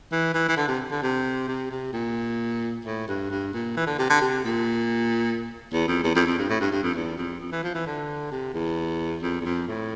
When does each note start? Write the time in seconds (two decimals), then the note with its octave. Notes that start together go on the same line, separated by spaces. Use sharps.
0.12 E3
0.34 E3
0.48 E3
0.57 D3
0.68 C3
0.91 D3
1.03 C3
1.48 C3
1.71 C3
1.93 A#2
2.85 A2
3.08 G2
3.31 G2
3.54 A#2
3.77 E3
3.87 D3
3.99 C3
4.10 D3
4.22 C3
4.44 A#2
5.73 E2
5.88 F2
6.04 E2
6.15 F2
6.26 F2
6.38 G2
6.50 A2
6.61 G2
6.72 G2
6.83 F2
6.95 E2
7.18 F2
7.40 F2
7.52 E3
7.64 F3
7.75 E3
7.86 D3
8.32 C3
8.54 E2
9.23 F2
9.41 E2
9.46 F2
9.68 A2